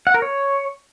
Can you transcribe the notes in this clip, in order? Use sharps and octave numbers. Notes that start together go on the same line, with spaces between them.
F#5
A#4
C#5